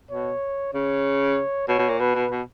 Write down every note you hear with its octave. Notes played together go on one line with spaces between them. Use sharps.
B2 C#5
C#3 C#5
B2 C#5
B2
A#2
B2 B4
B2
B2